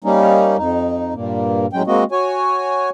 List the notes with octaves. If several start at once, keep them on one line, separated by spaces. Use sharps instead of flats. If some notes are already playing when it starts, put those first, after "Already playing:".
G3 A#3 C#4 D#4
F2 D#4
G2 A#2 A#3
A2 F#3 G#3 C#4 G5
G#3 A#3 C4 F#4 D#5
F#4 C#5 G#5